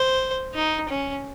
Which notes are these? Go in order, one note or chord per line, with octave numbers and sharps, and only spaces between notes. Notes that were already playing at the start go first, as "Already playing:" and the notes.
Already playing: C5
D#4
C#4